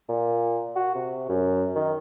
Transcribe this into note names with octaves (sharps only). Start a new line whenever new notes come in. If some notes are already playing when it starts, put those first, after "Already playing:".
A#2
F#4
C3
F#2
D#3